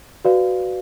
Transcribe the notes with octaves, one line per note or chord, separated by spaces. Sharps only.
F#4 B4 D5 F5